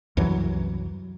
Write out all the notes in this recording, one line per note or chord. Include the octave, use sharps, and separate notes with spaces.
C2 F#2 E3 F#3